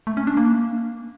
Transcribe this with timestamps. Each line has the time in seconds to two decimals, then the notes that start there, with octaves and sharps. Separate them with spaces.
0.07 A3
0.17 C#4
0.27 D4
0.37 A#3